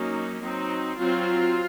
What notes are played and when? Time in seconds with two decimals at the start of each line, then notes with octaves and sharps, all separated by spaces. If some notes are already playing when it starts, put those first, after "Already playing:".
Already playing: F#3 A#3 C#4 D#4
0.43 F#3 C4 D#4
0.98 F#3 C4 F4